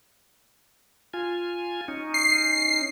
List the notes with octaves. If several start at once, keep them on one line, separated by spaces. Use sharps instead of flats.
F4 G#5
C#4 D#4
C7